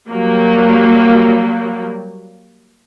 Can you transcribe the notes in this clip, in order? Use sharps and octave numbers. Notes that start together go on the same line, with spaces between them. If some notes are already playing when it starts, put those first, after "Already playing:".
F#3 G3 A#3